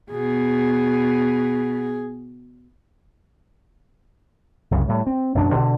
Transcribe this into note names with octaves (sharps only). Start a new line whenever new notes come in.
B2 G#4
C2 F#2 C#3
A2 G3
C4
A1 F#2 B2 D4
B2 D3